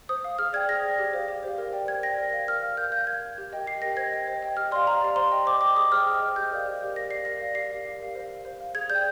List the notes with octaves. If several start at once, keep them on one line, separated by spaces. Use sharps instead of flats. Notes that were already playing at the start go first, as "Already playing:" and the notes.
C5 D#6
F5
G#4 F6
D5 G5 G#6
G#4 A#6
D5 G5
G4
C5 F5
G4
C5 F5
A#4
D5 G5
A#4 G#6
D5 G5 A#6
A#4
F5
A#4 F6
F5
A#4 G6
F5 G6
A#4 G#6
F5
G4
A#4 D#5 G5
G4 C7
A#4 D#5 G5 A#6
C5 G#6
D#5 G5
C5
D#5 G5
G4 F6
D5 F5 C6
G4 A#5
D5 F5
C5 C6
D#5 G5
C5 D6
D#5 G5 D6
G#4 D#6
C5 D#5 G5 F6
G#4
C5 D#5 G5
G4 G6
A#4 D5 F5
G4
A#4 D5 F5
A#4 A#6
D5 F5 C7
A#4 A#6
D5 F5
G4 C7
A#4 F5
G4
A#4 F5
C5
F5
C5
F5
G#4 G#6
D5 G6
G5